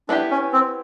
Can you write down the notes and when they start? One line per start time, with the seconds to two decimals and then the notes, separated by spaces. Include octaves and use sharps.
0.09 B3 D4 E4 G4
0.31 C#4
0.53 C4